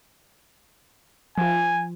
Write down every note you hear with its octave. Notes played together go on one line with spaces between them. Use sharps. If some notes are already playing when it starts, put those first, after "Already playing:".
F3 F4 G#5